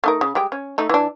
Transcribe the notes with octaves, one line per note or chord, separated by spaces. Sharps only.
A3 D#4 A#4
C#3
G3 G#3 G5
C#4
A3 D#4
E3 D4